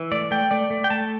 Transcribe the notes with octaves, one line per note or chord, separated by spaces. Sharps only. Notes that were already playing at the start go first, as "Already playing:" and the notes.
Already playing: E3
A3 D5
A3 G5
A3 D5
A3
G5
A3 A5